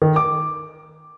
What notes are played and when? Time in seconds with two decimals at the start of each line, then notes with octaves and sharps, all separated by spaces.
0.02 D#3
0.16 D6